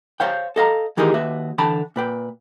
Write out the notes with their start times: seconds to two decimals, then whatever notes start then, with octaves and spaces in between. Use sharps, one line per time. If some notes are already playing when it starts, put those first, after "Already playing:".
0.20 C5 C#5 F5 G5
0.56 A4 D#5 F5 A#5
0.97 D#3 E3 D#4 G4 G#4 A#4
1.14 D#2 F#4 B4 E5
1.58 D3 E3 G5 A5 B5
1.96 A#2 B4 G5